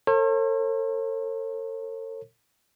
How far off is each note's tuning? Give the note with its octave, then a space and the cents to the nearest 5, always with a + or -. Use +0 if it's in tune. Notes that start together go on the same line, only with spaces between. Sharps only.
A4 +45 C#5 -45